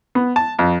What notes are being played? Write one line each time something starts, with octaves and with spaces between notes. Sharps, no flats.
B3
A5
F2